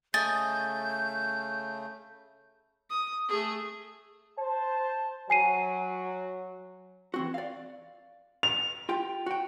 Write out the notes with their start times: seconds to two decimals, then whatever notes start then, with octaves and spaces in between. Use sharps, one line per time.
0.14 C#3 A3 D#5 G#5 G6 A6
2.90 D#6
3.29 A3 G#4
4.38 C5 A5
5.30 F#3 G#5 C7 D#7
7.14 E3 C4 F#4
7.34 D5 F5
8.43 F7
8.89 F4 G4 G5
9.26 F#4 G5